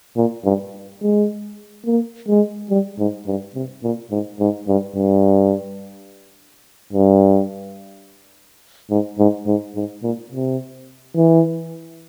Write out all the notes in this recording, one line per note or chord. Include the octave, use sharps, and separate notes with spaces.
A#2
G2
G#3
A#3
G#3
G3
G#2
G2
C3
A#2
G#2
G#2
G2
G2
G2
G#2
G#2
G#2
G#2
A#2
C3
E3